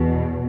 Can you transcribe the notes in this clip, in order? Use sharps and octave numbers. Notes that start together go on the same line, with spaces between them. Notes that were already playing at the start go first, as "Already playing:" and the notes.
Already playing: E2 B2